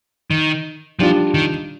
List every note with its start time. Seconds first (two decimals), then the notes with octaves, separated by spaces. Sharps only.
0.30 D#3
0.99 F3 G3 D4 F4
1.34 D#3